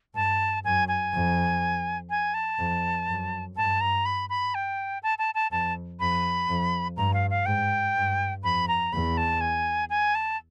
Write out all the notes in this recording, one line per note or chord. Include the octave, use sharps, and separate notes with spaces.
G2 A5
F#2 G#5
G#5
F2
G#5
A5
F2
F#2
G2 A5
A#5
B5
B5
G5
A5
A5
A5
F2 A5
F2 B5
F2
G2 A#5
F5
F5
G#2 G5
G2
F2 B5
A#5
E2 B5
A5
G#5
G#5
A5